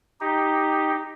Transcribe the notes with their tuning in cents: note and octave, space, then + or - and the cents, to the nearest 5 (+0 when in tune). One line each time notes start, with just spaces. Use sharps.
D#4 +0 G4 +0